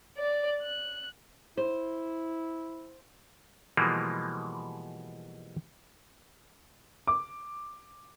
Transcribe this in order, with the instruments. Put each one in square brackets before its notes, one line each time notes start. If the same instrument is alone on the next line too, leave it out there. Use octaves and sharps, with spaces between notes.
[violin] D5
F#6
[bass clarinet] E4 [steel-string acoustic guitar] C5
[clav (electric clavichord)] B2 E3 F3 G3 G#3 A#3
[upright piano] D6